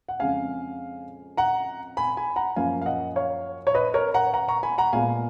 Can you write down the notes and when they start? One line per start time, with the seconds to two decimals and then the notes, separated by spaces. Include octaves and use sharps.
0.09 F#5
0.19 F2 C#3 G#3 C#4 F5 G#5
1.37 F#5 A#5
1.97 G#5 B5
2.17 G#5 B5
2.36 F#5 A#5
2.56 F#2 F3 A#3 C#4 F5 G#5
2.82 F5
2.86 D#5 F#5
3.16 C#5 F5
3.67 C#5
3.74 B4 D#5
3.94 A#4 C#5
4.14 F#5 A#5
4.34 F#5 A#5
4.48 A#5 C#6
4.63 G#5 B5
4.78 F#5 A#5
4.93 A#2 G#3 B3 F5 G#5